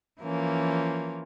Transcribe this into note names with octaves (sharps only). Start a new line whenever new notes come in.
E3 F3 A#3 C#4